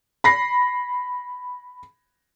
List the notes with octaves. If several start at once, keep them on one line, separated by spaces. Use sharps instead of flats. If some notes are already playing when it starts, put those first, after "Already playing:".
B5 A#6 C7